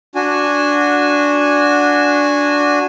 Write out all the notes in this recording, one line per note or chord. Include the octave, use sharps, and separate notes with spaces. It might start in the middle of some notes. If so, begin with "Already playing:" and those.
D4 F#4 G#5